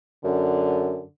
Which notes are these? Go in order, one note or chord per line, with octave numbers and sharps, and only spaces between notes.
F#2 D3